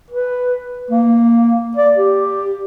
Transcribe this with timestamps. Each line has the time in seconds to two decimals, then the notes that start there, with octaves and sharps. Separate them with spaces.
0.10 B4
0.90 A#3
1.77 D5
1.97 G4